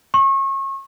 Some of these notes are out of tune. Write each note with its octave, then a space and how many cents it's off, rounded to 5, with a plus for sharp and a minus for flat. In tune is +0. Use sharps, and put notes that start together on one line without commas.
C#6 -30